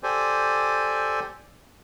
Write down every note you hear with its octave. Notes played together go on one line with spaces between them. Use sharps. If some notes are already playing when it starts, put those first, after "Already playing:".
G4 A4 C5 D5 G#5